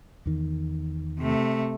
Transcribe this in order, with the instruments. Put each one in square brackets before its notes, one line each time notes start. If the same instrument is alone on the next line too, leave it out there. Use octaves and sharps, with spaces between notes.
[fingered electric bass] E2 D#3
[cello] C3 A3